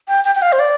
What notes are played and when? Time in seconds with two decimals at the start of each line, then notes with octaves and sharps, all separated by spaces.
0.08 G5
0.25 G5
0.35 G5
0.42 F5
0.52 C5
0.59 D5